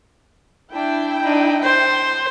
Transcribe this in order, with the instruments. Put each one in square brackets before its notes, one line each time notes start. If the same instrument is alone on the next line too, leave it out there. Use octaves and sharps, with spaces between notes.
[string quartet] D4 [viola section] E4 G5
[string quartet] D4 D#4
[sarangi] C5 [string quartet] C6